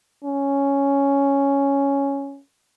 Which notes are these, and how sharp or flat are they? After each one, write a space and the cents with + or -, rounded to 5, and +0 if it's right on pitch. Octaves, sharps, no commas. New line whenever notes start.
C#4 +5